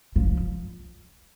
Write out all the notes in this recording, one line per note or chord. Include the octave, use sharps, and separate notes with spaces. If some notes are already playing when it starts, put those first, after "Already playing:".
F3